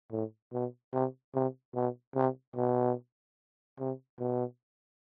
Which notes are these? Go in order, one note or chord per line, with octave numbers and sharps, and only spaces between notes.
A2
B2
C3
C3
B2
C3
B2
C3
B2